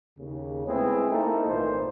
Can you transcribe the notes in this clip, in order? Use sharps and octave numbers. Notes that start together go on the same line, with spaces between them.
D#2 C#3
G#3 A3 B3 C4 E4 G#4
A3 A#3 D#4 E4 A4 A#4
G#1 A#2 E3 A3 A#3 C5